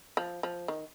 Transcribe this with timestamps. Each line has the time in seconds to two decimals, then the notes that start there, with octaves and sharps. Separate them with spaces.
0.17 F3
0.43 F3
0.68 D#3